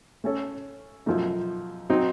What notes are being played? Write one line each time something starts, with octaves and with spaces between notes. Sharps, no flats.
A3 C#4 A4 C#5
F#2 F3 A3 D#4
F#3 C4 D#4